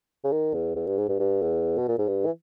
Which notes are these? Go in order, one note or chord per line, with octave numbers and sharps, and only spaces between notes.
C#3
D#3
E2
E2
G2
G#2
G2
G2
E2
B2
A#2
G#2
G2
E3